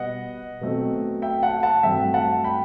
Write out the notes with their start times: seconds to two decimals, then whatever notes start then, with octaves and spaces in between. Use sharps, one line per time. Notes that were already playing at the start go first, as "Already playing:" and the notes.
Already playing: B2 G3 B3 D#5 F#5
0.61 B2 F#3 A3 C4
1.22 E5 G5
1.43 F#5 A5
1.63 F#5 A5
1.83 G2 F#3 A3 C4 E5 G5
2.14 F#5 A5
2.44 G5 B5